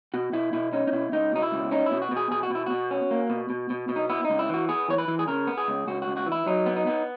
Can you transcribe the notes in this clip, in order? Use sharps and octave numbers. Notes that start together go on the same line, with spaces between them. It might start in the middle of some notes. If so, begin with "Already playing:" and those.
B2 F#4
B2 E4
B2 E4
C#4 D#4
D#4
B2 E4
C#2 D#4
B2 D#4
E4
C#2
C#4 D#4
E4
B2
F#4
B2
G#4
B2 G#4
F#4
B2 E4
B2 F#4
C#4
A#3
B2
B2
B2
B2
D#4
B3 E4
D#4
C#2
E4
E3 F#4
B3 G#4
E3 C#5
B4
E3
G#4
C#3 A#4
B3
G#4
C#2
C#2 F#4
F#4
C#2
F#4
E3
E4
F#3 D#4
B3
D#4
B3